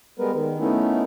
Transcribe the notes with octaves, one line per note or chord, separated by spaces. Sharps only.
G3 G#3 B3 A#4 B4
D#3
A3 B3 C#4 D#4 E4